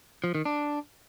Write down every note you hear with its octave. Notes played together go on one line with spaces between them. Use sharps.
F3
D#3
D4